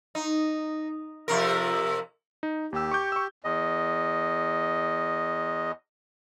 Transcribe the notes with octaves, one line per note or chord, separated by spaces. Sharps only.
D#4
F2 C3 A#4
D#4
D#2 G4 E6
C#6 D6 G6
C#6 E6
E2 D#5